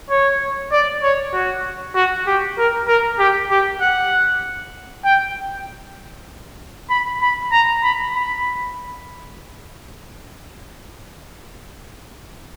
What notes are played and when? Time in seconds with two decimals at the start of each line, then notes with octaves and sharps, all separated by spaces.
0.10 C#5
0.72 D5
1.03 C#5
1.33 F#4
1.95 F#4
2.27 G4
2.58 A#4
2.88 A#4
3.19 G4
3.50 G4
3.81 F#5
5.04 G5
6.90 B5
7.21 B5
7.52 A#5
7.83 B5
8.15 B5